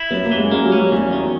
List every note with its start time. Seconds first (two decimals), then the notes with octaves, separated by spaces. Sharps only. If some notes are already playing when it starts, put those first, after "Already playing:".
Already playing: E4
0.11 F#2 B3
0.24 A#3
0.32 E3
0.38 G#3
0.52 G#3 A#3
0.65 F#3
0.72 C#4
0.79 F#3
0.92 E2
1.13 D#3